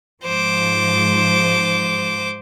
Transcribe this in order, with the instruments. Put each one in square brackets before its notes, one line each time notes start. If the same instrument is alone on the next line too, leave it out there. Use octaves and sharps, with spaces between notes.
[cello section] G#2 F3 [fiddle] C5 D6